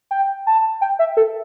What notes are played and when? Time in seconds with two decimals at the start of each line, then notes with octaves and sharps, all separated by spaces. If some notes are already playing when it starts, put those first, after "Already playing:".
0.11 G5
0.47 A5
0.81 G5
0.99 E5
1.17 A4